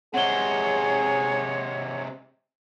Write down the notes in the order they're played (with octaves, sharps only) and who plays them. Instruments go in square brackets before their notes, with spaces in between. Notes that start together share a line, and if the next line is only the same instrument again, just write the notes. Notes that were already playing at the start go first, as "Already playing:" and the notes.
[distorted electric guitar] C3 G#3 [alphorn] G#4 [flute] C#5 [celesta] F#5 G7